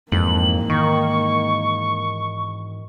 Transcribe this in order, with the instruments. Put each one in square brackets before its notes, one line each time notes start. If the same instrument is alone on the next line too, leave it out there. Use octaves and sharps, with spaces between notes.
[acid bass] F2 [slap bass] G#2 E3 G#3 [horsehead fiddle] A#3 [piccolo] F#7
[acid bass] D#3 [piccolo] C#6